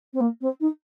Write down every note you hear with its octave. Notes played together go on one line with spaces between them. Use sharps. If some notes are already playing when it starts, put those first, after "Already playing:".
C4
A#3
C4
D#4